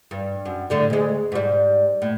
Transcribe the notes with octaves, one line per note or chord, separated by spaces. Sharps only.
G2
F#2
A2 D3 G3
D2 G#3
G#2 G3
A2